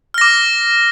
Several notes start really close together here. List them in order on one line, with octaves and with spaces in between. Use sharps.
F6 A#6 D6